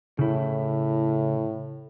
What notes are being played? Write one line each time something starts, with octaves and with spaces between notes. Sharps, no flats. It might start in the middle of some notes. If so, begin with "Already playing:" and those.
A2 C#3 E4